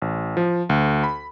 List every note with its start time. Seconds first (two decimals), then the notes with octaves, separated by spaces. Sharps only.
0.02 A1
0.37 F3
0.69 D2
1.04 B5